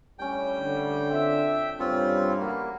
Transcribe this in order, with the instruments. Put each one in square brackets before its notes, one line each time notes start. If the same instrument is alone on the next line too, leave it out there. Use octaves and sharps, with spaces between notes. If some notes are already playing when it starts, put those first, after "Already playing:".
[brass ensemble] A2 G3 [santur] C#4 D4 [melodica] G5
[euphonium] D3
[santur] C4 F4 [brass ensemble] D4 E5
[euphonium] G2 [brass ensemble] C#3 E3 G3 [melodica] C4 F4 [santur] A4 C#5
[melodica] A#3 [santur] B3 F#4 F5